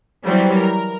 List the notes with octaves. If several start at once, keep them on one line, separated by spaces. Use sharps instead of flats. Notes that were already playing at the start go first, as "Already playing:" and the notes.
E3 F#3 G3 C4
A#4